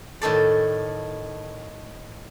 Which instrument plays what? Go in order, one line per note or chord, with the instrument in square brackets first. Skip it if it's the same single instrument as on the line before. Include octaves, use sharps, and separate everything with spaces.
[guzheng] A2 D#3 A4 D5